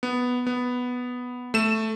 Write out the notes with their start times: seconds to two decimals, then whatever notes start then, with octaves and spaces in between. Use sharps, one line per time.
0.03 B3
0.47 B3
1.54 A3 E7